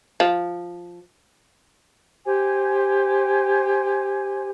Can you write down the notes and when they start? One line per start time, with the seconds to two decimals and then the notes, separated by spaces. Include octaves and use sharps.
0.20 F3
2.25 G4 C5 G#5